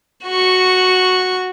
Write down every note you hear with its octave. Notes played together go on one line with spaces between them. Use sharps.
F#4 C#6